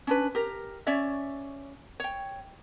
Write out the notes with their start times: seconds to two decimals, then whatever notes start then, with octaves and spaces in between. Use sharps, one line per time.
0.07 C#4 D4 B4
0.35 G4 A#4
0.86 C#4 C#5 D5 E5
2.00 C#5 G5